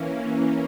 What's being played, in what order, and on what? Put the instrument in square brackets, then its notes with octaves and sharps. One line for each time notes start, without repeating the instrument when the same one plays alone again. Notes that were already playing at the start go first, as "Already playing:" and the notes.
Already playing: [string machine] E3 A#3 C#4